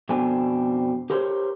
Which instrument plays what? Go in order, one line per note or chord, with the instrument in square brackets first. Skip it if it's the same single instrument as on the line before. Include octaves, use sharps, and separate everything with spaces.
[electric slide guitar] F2 B2 C4 D4 G#5
G4 A#4 C5 C#5